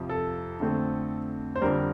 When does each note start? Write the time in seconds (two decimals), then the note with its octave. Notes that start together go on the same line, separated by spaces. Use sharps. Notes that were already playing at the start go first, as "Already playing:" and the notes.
Already playing: F2 C3 F3
0.09 A4
0.60 F2 D3 A3 C4
1.56 C5
1.61 F2 D3 G3 A#4